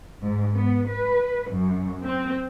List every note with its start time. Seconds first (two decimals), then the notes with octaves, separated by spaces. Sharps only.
0.23 G#2
0.56 B3
0.89 B4
1.51 F#2
2.05 C4